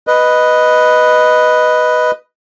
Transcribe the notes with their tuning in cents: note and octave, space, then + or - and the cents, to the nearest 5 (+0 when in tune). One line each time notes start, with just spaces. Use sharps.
B4 +0 D#5 +0